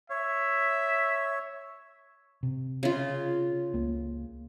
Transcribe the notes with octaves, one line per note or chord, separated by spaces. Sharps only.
C#5 E5
C3
C#3 F4
C#2 A#3